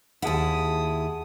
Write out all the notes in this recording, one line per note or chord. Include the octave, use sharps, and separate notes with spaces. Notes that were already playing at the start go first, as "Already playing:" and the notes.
D#2 E4 G#4 F#5 A5 D#6